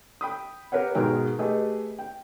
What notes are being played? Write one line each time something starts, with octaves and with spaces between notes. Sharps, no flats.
G5 B5 D#6
G4 A#4 B4 C#5 F#5
G#2 B2 G#3 A#4 G5 A#5
A3 G4 G#4 B4 D#5
G5